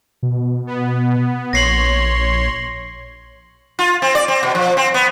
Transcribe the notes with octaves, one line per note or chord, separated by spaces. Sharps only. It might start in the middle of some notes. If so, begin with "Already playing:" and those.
B2
B3
A#1 C#5 C6 A#6 C7 F#7
F4
C4
D5
C4
B2
F3
C4
B3